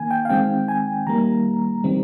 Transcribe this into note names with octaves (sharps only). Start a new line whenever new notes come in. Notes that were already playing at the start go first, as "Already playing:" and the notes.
Already playing: D#3 A#3 G#5
G5
F5
D#3 G#3 C4 G5
G#5
D#3 G3 A#3 A#5
D#3 G3 C4